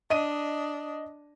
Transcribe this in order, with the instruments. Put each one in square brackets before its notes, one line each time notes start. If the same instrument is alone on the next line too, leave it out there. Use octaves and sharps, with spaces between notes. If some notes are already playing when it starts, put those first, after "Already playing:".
[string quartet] D4 [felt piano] D#5 D#7